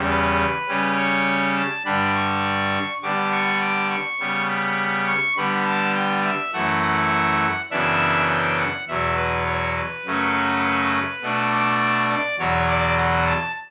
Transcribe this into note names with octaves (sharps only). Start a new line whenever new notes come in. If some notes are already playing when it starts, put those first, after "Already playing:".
Already playing: E2 C#3 G3
B4
C#3 G3 C#4
C#5
A5
G2 D3 G3 D4 B5
C#6
D3 G3 B3 D4 D6
C#6
D6
C#6
C#3 G3 B3
B5
C#6
D3 G3 B3 B5
A5
G5
E5
F#2 E3 A3 F#5
F#5
F#2 C#3 E3 B3 D4 E5
G5
F#5
E2 B2 F#3 E5
B4
C#5
B4
F#2 C#3 F#3 A3 C#4
B4
B4
B2 A3 D4
D5
D5
E2 B2 F#3 C#5
D5
F#5
A5